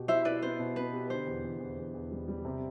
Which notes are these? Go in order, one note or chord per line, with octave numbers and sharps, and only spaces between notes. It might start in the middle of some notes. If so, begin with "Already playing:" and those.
Already playing: B2 G4
E4 C5 E5
E4 B4 D5
B3 C5
B2
B3 B4
G4
D3 C5
E2
E2
E2
E2
E2
G3
G3
C3